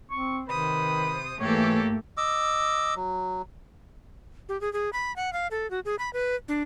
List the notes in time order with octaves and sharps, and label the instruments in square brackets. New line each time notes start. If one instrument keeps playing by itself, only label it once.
[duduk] C4 [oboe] C#6
[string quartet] C3 C5 D#6 [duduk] D#3 [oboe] B4
[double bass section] G#2 A3 [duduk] E3 [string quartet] A#3 G4 A4 [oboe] C#5
[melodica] D#5 D6 E6
F#3
[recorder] G4
G#4
G#4
B5
F#5
F5
A4
F#4
G#4
B5
B4
D4